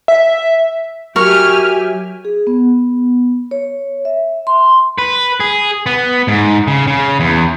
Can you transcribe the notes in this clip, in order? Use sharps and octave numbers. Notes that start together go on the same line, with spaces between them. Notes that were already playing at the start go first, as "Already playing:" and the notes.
E5
F#3 G4 A#4 E5 G#5 C#6 F6
G#4
B3
C#5
E5
C6
B4
G#4
B3
G#2
C#3
C#3
E2